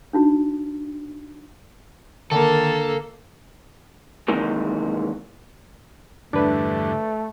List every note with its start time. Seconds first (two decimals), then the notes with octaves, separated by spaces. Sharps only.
0.13 D4 D#4 F#4
2.31 D3 D#3 A#3 A4
4.28 F#2 C3 D#3 E3 G#3 A#3
6.33 E2 G2 D3 A3 D4 B4